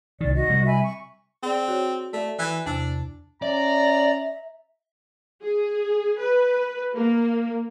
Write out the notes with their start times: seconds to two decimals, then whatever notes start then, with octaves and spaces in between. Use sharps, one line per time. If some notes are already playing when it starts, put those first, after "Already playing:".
0.21 C2 D#3 D5
0.33 F#4 D#5
0.49 C3 G3
0.66 E5 G#5 B5
0.82 C#6
1.43 C4 G#4 D5
1.68 F#4 C#5
2.13 A3 D5 E5
2.39 E3 G#6
2.66 E2 C3 D4 E6
3.42 C#4 D5 E5 A#5
5.42 G#4
6.20 B4
6.95 A#3